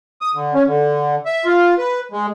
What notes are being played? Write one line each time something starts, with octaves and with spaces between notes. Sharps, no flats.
D#6
D3
C#4
D3
E5
F4
B4
G#3